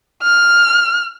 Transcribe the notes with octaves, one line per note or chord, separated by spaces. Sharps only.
F6